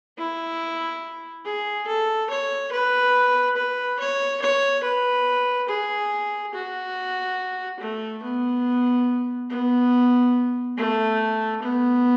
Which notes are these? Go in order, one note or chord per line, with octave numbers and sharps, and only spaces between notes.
E4
G#4
A4
C#5
B4
B4
C#5
C#5
B4
G#4
F#4
A3
B3
B3
A3
B3